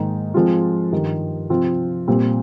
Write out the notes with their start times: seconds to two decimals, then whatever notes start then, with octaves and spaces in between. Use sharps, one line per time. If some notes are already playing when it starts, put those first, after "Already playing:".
Already playing: G#2 D#3 A#3 D#4
0.34 F3 G#3 C4 F4
0.92 G2 D#3 G3
1.50 C3 F3 C4 F4
2.08 A#2 G3 C4